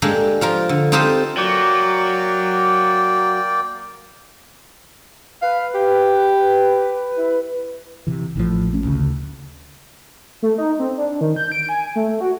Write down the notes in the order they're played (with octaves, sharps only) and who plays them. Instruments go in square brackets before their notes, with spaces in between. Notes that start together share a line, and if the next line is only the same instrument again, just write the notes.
[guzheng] G#3 A#3 D4 G4 A4
F3 F4 A#4
D3
C4 D#4 F4 G4 A4 C5
[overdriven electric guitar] F#3 [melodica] A#3 D5 G5
[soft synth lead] B4 [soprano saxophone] F5
[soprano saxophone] G4
E4
[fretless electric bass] C3 E3
A1 A2 C3 F3
A1 A3 C#4
D2 C#3
[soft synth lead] A3
D#4
C4
D4
D#3
G6
D7
G#5
A3
F#4